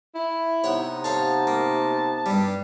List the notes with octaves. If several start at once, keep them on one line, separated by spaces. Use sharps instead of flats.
E4
C3 B3 D#4 C#5 F#5
C#5 F5 A5
A#3
G2 G3